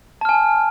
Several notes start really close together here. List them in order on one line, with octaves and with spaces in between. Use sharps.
A5 F6 G#5